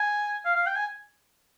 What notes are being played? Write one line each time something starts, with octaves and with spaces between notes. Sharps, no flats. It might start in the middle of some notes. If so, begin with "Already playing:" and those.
Already playing: G#5
F5
F5
G5
G#5